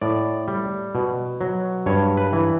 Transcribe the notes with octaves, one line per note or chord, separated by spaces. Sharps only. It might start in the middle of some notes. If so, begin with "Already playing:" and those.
A2 D5
G3
B2
F#3
G2 C#5
B4
E3